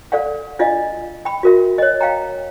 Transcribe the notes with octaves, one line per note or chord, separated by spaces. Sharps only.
A4 D5 F5 F#5
D4 F4 D5 D#5 F5
G5 B5
F#4 A#4 E5
C#5 D#5
F5 G5 A#5